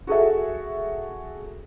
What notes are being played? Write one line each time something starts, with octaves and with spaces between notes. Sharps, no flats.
F#4 G#4 A4 E5